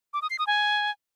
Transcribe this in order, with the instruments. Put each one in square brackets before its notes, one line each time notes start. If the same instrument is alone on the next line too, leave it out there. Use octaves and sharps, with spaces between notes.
[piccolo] D6
D#6
C7
D#6
G#5